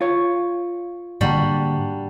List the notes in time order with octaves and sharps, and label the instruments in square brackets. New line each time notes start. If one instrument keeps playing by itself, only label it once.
[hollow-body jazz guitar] F4 C#5
[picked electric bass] G#2 D3 A#3 [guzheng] G3 D4 F#4